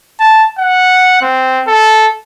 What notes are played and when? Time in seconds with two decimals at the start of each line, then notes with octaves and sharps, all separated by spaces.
0.20 A5
0.59 F#5
1.22 C4
1.67 A4